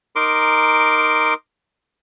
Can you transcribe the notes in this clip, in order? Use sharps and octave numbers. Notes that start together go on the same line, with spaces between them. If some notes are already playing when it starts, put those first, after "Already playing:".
D#4 A#4 C6 D6